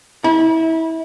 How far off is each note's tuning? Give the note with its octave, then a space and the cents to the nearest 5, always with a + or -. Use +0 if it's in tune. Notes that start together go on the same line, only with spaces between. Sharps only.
E4 -25 B5 -40